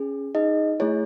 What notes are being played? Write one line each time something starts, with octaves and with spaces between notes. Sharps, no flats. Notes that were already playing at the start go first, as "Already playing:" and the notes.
Already playing: C#4 G#4
D#4 G#4 D#5
A3 E4 G#4 C#5